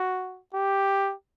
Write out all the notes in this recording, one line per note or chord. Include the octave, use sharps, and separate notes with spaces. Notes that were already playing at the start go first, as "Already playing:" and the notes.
Already playing: F#4
G4